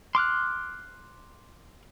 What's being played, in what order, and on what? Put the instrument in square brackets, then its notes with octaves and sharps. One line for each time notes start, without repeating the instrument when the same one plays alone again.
[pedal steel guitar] C6 D6 F6 F#6